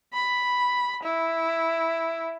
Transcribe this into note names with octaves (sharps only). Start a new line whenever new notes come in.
B5
E4